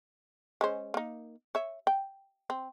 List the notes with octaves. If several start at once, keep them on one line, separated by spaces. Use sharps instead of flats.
G#3 C#4 C5
A#3 D#4
C#5 E5
G5
C4